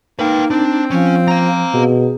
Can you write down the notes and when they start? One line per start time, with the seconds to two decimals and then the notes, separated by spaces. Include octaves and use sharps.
0.19 A#3 D#4 B4 G5
0.51 C4 D4
0.91 F3 C#4
1.28 F5 A#5
1.74 B2 G#4